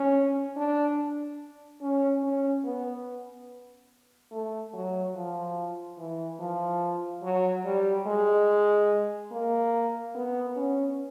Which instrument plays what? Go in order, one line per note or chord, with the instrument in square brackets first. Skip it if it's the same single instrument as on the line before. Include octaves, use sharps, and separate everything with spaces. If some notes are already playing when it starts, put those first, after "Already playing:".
Already playing: [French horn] C#4
D4
C#4
C#4
B3
A3
F#3
F3
E3
F3
F#3
G3
G#3
A#3
B3
C#4